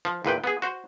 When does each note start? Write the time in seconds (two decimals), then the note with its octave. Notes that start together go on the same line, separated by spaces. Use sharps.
0.05 F3
0.25 E2 A#2 B4 G5
0.44 B3 G#4
0.62 F#4 C5